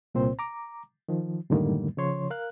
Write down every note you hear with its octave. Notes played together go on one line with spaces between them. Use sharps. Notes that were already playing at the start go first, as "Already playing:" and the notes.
C2 A#2 C4 C5
A#5 D6
D#3 F3
F#2 A2 D3 D#3 G3 A#3
C#3 F3 C#5 C6
A#4 F5 F#6